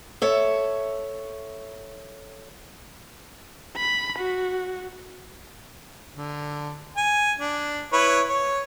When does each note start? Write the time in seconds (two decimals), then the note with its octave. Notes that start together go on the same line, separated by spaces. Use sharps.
0.22 A4 C#5 E5
3.77 B5
4.19 F#4
6.15 D3
6.97 G#5
7.39 D4
7.93 E4 B4 C#5
8.29 C#5